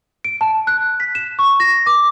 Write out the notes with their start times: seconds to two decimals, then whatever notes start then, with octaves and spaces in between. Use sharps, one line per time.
0.24 D7
0.41 A5
0.67 F#6
1.00 B6
1.15 E7
1.39 C#6
1.60 A#6
1.86 D6